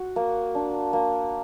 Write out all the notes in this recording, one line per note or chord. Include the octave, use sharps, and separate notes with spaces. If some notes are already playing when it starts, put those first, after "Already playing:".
Already playing: F#4
A#3
D4
A#3